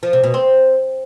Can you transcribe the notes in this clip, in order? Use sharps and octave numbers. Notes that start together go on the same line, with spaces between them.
F3
C3
B2
C4